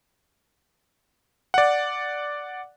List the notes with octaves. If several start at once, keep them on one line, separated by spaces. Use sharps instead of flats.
D5 F#5